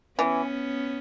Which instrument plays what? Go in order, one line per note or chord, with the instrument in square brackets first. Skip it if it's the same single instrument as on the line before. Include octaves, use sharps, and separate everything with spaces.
[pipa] E3 [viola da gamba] B3 C#4